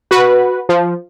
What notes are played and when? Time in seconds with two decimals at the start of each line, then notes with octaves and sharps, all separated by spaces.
0.11 F#4 B4
0.69 F3